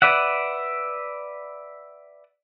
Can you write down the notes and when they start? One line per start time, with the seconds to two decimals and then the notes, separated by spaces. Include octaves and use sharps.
0.02 B4 D5 E5 F#5